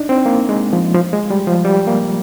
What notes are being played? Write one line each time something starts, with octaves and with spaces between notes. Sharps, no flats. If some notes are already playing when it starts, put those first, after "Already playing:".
Already playing: D4 D#4
C4
A#3
G#3
F3
F3
G#3
G3
F3
G3
A#3